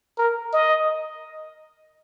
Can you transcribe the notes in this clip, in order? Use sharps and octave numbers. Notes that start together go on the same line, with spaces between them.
A#4
D#5